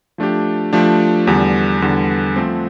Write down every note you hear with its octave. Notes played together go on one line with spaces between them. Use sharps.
F3 A3 D4 G4
F3 A3 D4 G4
E2 D3 G3
E2 D3 G3
F3 A3 C4